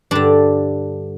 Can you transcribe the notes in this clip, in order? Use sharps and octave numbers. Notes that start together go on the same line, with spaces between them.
G2 D3 D4